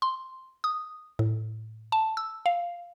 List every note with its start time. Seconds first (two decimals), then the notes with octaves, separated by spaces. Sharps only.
0.02 C6
0.64 D#6
1.19 A2
1.92 A5
2.17 E6
2.46 F5